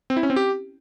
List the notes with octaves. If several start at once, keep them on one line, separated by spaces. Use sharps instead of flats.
C4
E4
C#4
C4
G4